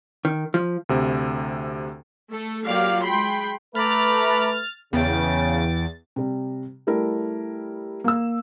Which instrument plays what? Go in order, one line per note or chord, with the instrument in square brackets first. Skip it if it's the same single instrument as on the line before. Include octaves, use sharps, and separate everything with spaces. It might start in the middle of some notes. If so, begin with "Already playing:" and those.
[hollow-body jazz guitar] D#3
F3
[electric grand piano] D2 C3
[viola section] A3 A4
F#3 A#3 F4 G4 D5 F5
G#3 G5 B5 C6
[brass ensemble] A3 B4 [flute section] A#5 B5 D6 [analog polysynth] F6 A6
[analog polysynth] E2 A6 [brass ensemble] C#3 [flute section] G5
[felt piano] C3 G3
G3 A3 E4 A#4
A#3 E6